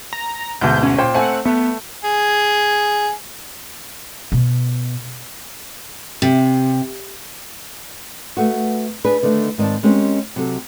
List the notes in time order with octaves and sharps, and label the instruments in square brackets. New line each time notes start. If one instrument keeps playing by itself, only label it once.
[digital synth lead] A#5
[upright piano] D2 G#2 B2 [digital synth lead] G6
[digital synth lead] C#4
[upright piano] A#2 C5 G5
[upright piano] A3 C4 G#5 [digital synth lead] F#5
[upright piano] A3 [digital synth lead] B3
[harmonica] G#4
[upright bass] B2
[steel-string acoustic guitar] C3
[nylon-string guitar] A3 B3 F#4
D4 G#4 B4
D3 D#3 A3 D4
G#2 D#3 C4 D5 A5
G#3 C4 C#4 G4 A#4
C3 F#3 A4